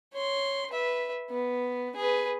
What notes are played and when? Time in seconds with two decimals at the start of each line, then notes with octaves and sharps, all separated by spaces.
0.13 C#5 C6
0.70 B4 E5
1.30 B3
1.96 G#4 B4